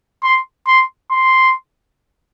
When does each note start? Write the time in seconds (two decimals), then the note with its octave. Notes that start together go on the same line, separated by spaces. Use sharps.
0.23 C6
0.67 C6
1.11 C6